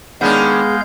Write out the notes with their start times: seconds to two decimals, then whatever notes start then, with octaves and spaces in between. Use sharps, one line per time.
0.21 D#3 G#3 B3 C#4 D4 G#4 F5 G6